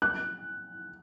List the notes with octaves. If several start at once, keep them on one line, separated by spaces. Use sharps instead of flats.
F#6